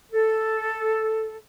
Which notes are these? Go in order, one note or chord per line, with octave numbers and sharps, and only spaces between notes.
A4